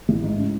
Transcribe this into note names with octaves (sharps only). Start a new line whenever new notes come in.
A1
G#2
C#3